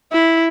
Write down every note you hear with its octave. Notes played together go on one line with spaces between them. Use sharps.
E4